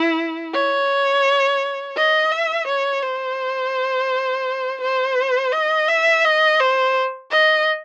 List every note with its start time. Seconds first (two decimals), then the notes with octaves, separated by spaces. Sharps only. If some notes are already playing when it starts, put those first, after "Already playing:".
Already playing: E4
0.54 C#5
1.97 D#5
2.32 E5
2.67 C#5
3.03 C5
4.81 C5
5.53 D#5
5.89 E5
6.25 D#5
6.60 C5
7.31 D#5